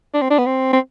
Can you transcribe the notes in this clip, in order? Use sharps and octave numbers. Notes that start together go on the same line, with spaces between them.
D4
C4
D4
B3
C4
C4